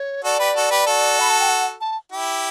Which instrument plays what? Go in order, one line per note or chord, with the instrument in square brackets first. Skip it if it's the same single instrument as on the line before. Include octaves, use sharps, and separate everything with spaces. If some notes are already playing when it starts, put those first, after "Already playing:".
Already playing: [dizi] C#5
[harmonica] F#4 A4 [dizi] D5
[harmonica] G4 B4
F#4 A4
G4 B4
F#4 A4
[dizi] B5
A5
G5
F#5
A5
[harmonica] E4 G4